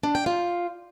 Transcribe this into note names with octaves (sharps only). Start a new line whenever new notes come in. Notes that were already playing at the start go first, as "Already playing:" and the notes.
D4
G5
F4